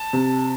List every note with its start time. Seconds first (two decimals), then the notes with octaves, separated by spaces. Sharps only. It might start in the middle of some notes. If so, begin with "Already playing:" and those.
Already playing: A5
0.13 C3